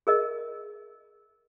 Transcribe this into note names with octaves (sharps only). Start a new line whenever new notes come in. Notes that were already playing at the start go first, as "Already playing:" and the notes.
G#4 A#4 D#5